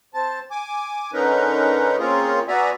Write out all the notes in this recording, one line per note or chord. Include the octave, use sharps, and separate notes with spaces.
C4 A5
G#5 D6
D3 C#4 D#4 A#4 B4
A#3 C4 C#4 F4 G#4 A#4
B3 F#4 D5 E5 G#5 A#5